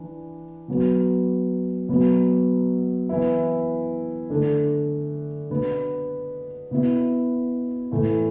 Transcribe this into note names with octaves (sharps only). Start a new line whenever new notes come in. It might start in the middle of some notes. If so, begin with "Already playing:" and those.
Already playing: E3 D4
B2 F#3 B3
B2 F#3 B3
E3 B3 E4
D3 A3 D4
B2 B3 D4
B2 B3 E4
A2 E3 A3 E4